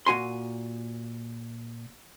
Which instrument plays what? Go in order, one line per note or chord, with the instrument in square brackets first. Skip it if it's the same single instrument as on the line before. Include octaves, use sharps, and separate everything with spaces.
[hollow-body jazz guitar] A#2 F#4 G#5 C6